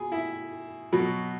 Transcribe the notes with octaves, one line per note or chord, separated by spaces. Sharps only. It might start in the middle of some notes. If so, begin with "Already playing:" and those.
Already playing: B2 G#4 G#5
E4 E5
B2 F#3